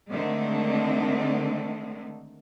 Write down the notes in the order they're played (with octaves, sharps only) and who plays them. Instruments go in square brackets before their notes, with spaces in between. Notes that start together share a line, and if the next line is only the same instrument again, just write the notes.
[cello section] D3 D#3 G#3 A3 C4